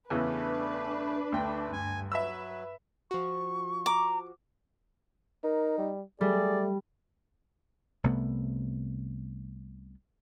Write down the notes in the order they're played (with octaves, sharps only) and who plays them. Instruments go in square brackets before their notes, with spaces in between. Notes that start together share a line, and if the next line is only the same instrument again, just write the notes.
[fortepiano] E2 C#3 E3 [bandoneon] A3 [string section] D4 B4
[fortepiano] D2 G5 [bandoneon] A3
[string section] G2 [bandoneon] G#5
[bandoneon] F#3 [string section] B4 [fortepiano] E5 B5 E6
[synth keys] F3 F#4 [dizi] C#6
[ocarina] A#5 [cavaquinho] D6
[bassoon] D#4 [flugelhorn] A#4
[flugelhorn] G3
[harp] G3 [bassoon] A3 [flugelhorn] G#4 [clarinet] D5
[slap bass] C2 C3 A3 B3